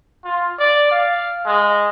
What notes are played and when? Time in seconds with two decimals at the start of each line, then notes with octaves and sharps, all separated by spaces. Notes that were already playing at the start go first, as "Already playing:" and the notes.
0.25 F4
0.59 D5
0.91 F5
1.46 G#3